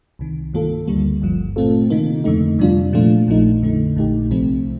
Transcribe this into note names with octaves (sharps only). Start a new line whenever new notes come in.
C2 C3 D#3
G2 D#3 A#3 F4 A4
D2 D3 G3 A#3
G1 G2 F3
A#2 A3 C4 F4 A4
C3 D#3 A#3 D#4
F2 D3 A3 D#4
F2 C3 G3 D4 F4
A#2 F3 A3 D4 F4
A#1 A#2 F3 A3 D#4
F2 D3 A3 D#4
A#1 A#2 A3 D#4 G4
C2 C3 F3 A3 C4